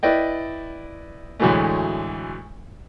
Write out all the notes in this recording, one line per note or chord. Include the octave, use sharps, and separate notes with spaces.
E4 B4 D5 D#5 G5
D2 A2 E3 F#3 G#3 A3